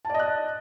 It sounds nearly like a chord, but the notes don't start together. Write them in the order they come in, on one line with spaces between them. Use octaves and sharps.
A5 D5 D#5 F#6